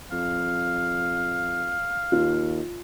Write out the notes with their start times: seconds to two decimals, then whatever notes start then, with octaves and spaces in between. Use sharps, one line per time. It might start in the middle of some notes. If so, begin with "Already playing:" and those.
0.12 F2 F5
2.12 D#2 F4